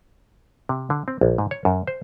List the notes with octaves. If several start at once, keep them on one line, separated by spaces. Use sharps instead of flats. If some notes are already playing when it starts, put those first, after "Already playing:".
C3
D3
C4
A#1
G#2
C#5
F#2
C5